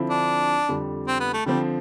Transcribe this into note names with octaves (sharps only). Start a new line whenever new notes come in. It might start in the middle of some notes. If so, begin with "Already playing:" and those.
Already playing: D3 F3 C4 E4
D4
F2 D3 G3
C4
B3
A3
D3 F3 G3 C4